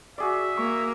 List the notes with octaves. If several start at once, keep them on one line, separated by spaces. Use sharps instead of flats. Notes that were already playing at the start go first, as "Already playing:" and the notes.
F#4 G#4 D5 E5
A#3 C#6